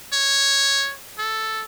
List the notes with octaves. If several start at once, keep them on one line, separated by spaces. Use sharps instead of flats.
C#5
A4